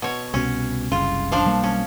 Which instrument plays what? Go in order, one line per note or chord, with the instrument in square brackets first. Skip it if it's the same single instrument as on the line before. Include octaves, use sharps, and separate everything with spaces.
[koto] B2 C#5
[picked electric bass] C2 B2 [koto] C#4
[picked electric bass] F#1 C2 C#3 [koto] F4
[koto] F3 D4 F5
[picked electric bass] B1 G3 A#3
[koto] C#4